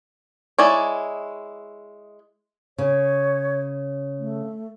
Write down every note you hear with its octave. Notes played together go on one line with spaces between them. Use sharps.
G#3 E4 C#5 D5
C#3 C#5
A3